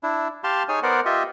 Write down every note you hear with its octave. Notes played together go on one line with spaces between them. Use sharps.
D4 E4
G4 F5 A5 C6
D#4 G#4 C#5 G#5
B3 A#4 C5 D5 F#5
F4 G4 D#5 E5